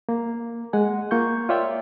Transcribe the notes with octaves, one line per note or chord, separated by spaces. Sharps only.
A#3
G#3 F#5 G#5
A#3 F4 C#6 G6
F4 C#5 D5 E5 G5